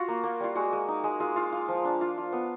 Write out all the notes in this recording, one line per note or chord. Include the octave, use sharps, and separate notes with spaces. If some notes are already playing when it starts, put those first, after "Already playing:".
Already playing: F4 F#4
A#3
A#3
G3 F4
G#3 F#4
G#3
D#4
G#3
G#3 F4
F4
F4
F3
D4
F4
F4
B3